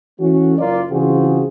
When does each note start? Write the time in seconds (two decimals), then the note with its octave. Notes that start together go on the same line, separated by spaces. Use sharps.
0.19 E3 A3 C#4 F#4
0.58 F#1 F#3 F4 A#4 D5
0.90 C#3 E3 C4 F4 F#4 G#4